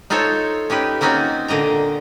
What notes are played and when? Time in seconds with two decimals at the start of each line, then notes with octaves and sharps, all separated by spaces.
0.10 D#4 F4 A4 C5 C#5
0.70 C#4 D#4 G4 B4
1.01 A#3 C4 C#4 D#4 F4 F#4
1.48 A#2 D3 A#3 D#5 A#5